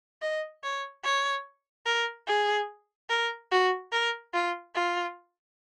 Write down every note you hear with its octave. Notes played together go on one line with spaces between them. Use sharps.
D#5
C#5
C#5
A#4
G#4
A#4
F#4
A#4
F4
F4